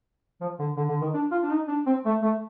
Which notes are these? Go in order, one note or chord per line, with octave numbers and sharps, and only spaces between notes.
F3
D3
D3
D3
D#3
D4
F4
D4
D#4
D4
C4
A3
A3